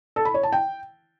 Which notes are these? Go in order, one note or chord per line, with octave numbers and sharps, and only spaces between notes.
A4
B5
C#5
A5
G5